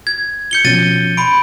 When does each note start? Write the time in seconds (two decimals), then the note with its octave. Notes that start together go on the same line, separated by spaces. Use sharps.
0.07 G#6
0.51 G6 C#7 G7
0.65 B2 F3 C#4 A6 D#7
1.17 B5 C6 D7